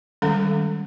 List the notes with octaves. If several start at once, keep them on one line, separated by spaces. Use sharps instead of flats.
D#3 G3 G#3 C#4 A4 A#5